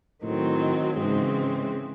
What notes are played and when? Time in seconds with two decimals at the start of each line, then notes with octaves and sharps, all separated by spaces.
0.23 A2 D#3 F#3 C4
0.96 G#2 C#3 E3 G#3 C4